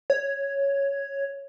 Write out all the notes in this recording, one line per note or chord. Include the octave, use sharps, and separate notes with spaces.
C#5